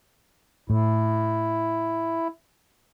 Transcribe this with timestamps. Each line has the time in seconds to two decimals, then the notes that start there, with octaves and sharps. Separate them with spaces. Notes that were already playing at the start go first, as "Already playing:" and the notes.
0.70 A2 E4